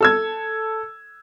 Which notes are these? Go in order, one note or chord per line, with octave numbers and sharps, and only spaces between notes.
A4 E6 G#6